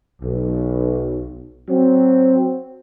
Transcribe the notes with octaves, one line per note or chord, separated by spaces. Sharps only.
B1
F#3 C4